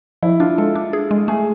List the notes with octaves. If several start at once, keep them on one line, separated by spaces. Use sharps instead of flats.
F3 E4
D4 F4
G#3 A4
D4
G#4
G#3
A3 G#4